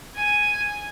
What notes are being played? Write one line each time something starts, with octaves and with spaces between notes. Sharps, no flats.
G#5